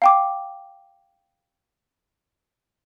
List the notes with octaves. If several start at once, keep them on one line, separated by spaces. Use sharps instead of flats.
F5 G5 D6